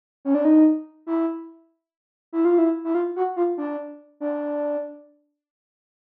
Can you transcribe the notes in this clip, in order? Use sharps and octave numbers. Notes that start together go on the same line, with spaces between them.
C#4
D4
D#4
E4
E4
F4
E4
E4
F4
F#4
F4
D4
D4